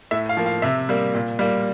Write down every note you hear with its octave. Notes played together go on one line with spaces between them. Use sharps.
A2 E5
F5
F3 A#3
F5
C3 E5
G3 A#3
A#2
G3 A#3